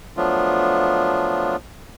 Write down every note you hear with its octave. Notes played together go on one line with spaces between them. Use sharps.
F3 F#3 A3 B3 D4 F4